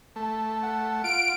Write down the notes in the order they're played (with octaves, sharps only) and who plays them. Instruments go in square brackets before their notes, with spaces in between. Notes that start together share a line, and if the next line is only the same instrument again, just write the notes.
[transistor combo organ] A3
[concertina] F#5
[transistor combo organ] F4 [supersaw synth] D7